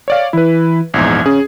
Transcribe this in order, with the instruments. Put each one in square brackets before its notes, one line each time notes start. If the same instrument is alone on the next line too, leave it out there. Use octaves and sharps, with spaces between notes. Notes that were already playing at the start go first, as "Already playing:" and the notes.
[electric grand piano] C#5 D5 F5
[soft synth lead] E3 [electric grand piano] E4 B4
[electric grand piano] A#1 E2 G#2 [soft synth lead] G#6
[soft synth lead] C#4 [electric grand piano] G#4